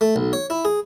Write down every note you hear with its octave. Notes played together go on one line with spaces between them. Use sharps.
A3
B1
C#5
E4
G#4